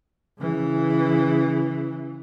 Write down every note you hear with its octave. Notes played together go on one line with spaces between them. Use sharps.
C#3 E3